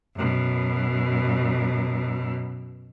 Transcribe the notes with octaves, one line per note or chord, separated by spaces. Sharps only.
F#2 B2